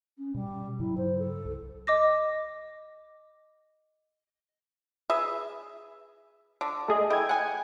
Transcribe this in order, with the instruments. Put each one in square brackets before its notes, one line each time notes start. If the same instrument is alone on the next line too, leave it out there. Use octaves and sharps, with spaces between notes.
[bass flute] C#4
[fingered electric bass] B2 [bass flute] G3
[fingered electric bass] G2 C#3 F#3 [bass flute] E4
[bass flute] C5
A4
[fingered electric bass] C2
[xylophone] D#5 D6 A#6
[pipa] G#4 B4 E5
D3
[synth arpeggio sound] A3 G#4 D#5
[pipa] E3 [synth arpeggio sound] G5 G#6
[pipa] F#5 G#5